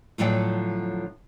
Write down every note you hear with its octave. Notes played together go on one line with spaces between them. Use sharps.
A2 D3 F3 F#3 D5 G5